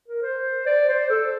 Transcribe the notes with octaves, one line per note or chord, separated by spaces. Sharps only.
A#4
C5
D5
C5
A4